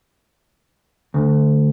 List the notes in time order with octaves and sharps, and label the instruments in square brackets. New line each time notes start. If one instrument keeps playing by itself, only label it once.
[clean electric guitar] D2